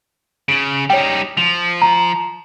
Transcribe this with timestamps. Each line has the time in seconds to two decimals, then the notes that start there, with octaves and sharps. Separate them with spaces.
0.48 C#3 D7 F#7
0.90 G3 D#4 C#5 G5
1.37 F3 F7
1.82 A#5